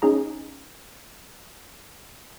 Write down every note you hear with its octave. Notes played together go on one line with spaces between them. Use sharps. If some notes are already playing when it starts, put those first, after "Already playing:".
C#4 D#4 G#4 A#5